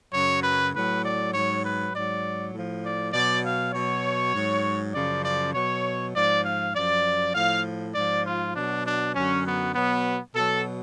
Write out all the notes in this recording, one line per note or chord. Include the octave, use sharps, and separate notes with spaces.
F#2 C#3 F#3 C#5
B4
A2 F#3 B4
D5
G#2 F#3 C#5
B4
G#2 F#3 D5
A2 F3
D5
B2 F#3 D5
F5
B2 F#3 C#5
G#2 F#3
F#2 C#3 F3 D5
D5
B2 F#3 C#5
G#2 F3 D5
F5
F#2 F3 D5
A2 F3 F5
G#2 F3 D5
F4
B2 F#3 D4
D4
F#2 D3 F#3 C#4
B3
B2 F#3 B3
B2 F#3 A4